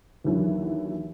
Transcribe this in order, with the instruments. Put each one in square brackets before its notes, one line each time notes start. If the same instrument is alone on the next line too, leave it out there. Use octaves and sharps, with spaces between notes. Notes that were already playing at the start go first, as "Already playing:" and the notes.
[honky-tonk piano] D#2 D3 E3 F#3